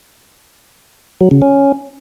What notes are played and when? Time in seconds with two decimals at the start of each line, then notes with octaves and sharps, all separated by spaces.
1.21 F#3
1.31 C#3
1.42 C#4